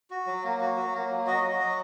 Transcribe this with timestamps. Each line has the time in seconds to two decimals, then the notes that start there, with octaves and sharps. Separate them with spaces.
0.10 F#4
0.26 F#3
0.44 A#3
0.61 F#4
0.77 F#3
0.94 A#3
1.10 F#3
1.27 F#4 D#5
1.43 F#4
1.60 F#3